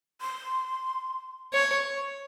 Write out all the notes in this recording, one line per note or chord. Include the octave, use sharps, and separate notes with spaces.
C6
C#5 C#6